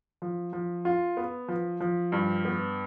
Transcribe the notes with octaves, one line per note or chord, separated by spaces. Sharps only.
F3
F3
F4
B3
F3
F3
G2
B3